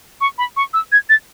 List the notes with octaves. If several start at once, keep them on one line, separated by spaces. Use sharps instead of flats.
C#6
B5
C#6
E6
G#6
A6